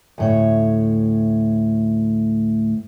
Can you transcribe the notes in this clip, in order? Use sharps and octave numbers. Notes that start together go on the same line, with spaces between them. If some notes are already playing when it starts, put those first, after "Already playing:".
D2 A2 C#5